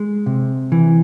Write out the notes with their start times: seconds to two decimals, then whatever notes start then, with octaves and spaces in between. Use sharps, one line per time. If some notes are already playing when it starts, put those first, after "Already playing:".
Already playing: G#3
0.26 C3
0.72 E3